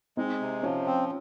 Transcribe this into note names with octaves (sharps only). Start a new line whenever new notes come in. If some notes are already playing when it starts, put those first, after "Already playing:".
G#3 C4 D#4
C3
F3 C#4 F4
C4